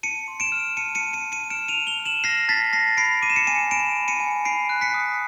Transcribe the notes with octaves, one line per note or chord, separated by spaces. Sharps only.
A5 C#7 D#7
C6
D7 E7
F6
A5 C#7 D#7
C#7 D#7
A5
C#7 D#7
A5
C#7 D#7
F6 D7 E7
D#7 F7
A5
F7 G7
F6
E7 F#7
F6 A#6 C7
A5 A6 B6
A5 A#6 C7
B5 C7 D7
D6 D#7
E7
C#7 D#7
G#5 C#7 D#7
B5 D7 E7
B5
C#7 D#7
G#5
B5 C7 D7
F#6
B6 C#7
D#6